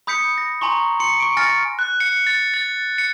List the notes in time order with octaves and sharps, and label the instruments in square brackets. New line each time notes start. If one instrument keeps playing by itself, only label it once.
[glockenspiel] B5 D#6 G6 B6 C#7
A#6
G#5 A#5 C6 C#6
C6 C#7
C#6 D7
G#5 F6 A6 A#6 C#7
[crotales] F#6
C#7
A6
A6
C#7